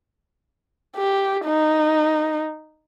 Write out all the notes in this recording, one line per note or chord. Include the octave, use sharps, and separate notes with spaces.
G4
D#4